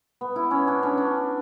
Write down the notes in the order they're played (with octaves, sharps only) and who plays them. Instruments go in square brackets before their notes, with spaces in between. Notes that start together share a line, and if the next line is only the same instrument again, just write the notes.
[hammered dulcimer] B3
E4
C#4
D4
C#4
D4